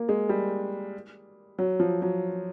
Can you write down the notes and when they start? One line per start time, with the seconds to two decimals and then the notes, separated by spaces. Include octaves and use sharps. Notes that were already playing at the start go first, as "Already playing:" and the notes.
Already playing: A#3
0.09 G#3
0.29 G3
1.59 F#3
1.80 F3
2.02 F#3